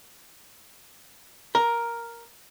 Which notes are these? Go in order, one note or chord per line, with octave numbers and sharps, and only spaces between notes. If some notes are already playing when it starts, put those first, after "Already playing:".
A#4